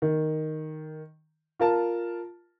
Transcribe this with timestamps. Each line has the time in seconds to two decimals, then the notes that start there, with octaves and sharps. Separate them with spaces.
0.02 D#3
1.59 F4 A#4 A5